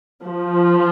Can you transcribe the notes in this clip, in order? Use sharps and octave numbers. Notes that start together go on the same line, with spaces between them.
F3